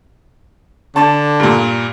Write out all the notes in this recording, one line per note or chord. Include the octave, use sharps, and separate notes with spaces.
D3 A5
G2 A#2